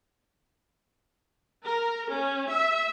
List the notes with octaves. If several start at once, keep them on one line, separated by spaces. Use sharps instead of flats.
A#4
C#4
E5